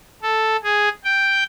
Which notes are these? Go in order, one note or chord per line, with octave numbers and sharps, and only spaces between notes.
A4
G#4
G5